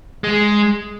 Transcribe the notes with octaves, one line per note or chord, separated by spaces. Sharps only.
G#3